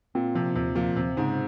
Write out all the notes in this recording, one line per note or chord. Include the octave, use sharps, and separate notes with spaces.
A#2 C4
C3 F3
D#2 C3
A#2 F3
D#2 C3
G#2 C#3